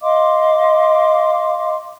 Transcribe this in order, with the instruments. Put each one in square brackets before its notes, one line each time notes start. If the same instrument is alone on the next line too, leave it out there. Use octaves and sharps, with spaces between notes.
[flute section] D#5 F5 C6 D6